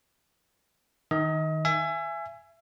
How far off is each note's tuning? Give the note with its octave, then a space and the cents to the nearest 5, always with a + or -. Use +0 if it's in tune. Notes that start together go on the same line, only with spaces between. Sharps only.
D#3 +0 D#5 +35
E5 +30 G#5 +0